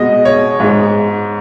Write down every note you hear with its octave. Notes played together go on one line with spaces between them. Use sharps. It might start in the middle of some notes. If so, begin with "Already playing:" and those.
Already playing: B2 G#3 D#5
C#5
G#2 G#3